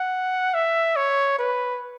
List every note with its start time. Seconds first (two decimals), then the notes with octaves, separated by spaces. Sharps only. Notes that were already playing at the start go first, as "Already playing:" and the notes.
Already playing: F#5
0.54 E5
0.96 C#5
1.39 B4